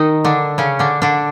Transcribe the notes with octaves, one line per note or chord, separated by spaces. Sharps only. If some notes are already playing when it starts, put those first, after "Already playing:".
Already playing: D#3 D#4
D3 D4
C#3 C#4
D3 D4
D3 D4